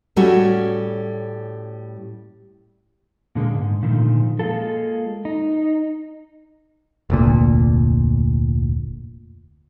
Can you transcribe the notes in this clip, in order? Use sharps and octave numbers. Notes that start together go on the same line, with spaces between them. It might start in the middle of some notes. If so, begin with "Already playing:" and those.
A2 G3 A3 C#4 F#4
A#2 D3 G#3 A#3
G#2
A#2 D3 D#3 F3 A3
G#3 A#3 E4 F4 A4
D#4
F1 D2 A#2